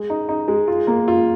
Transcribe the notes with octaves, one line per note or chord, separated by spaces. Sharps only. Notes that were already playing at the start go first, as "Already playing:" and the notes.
Already playing: G#3
D#4
D#4
G#3
F4
A#3
F4